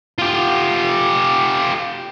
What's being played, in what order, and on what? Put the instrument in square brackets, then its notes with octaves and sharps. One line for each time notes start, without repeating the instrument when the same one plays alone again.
[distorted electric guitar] F4 G4